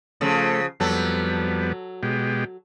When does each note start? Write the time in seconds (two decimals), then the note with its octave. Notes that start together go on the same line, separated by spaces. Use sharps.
0.21 C#3 F3 A3
0.80 F2 F#3 G3 B3 A4
2.03 B2 G#3 G4